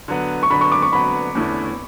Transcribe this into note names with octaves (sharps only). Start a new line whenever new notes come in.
D3 F#3 B3
C#6
D3 F#3 B3 B5
C#6
D6
C#6
D3 F#3 B3 B5
E2 D3 A3 C#4 E4